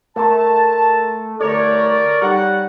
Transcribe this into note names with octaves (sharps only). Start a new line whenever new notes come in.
A3 A#4 A5 A#5 C6
C2 D3 A3 A4 A#4 C#5 D5
G3 D#4 G4 F#5